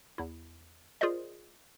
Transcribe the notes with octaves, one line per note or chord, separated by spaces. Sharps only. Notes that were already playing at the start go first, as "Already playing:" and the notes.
E2 E4
F4 G#4 A#4 C5 D5 D#5